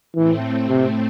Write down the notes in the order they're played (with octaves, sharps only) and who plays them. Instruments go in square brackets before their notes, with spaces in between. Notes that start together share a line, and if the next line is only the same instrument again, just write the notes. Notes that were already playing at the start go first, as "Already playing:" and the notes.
[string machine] A2 A3 C4 [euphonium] E3
[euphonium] C3